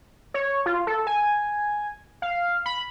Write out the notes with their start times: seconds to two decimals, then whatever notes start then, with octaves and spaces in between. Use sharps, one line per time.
0.34 C#5
0.66 F4
0.87 A4
1.07 G#5
2.22 F5
2.66 B5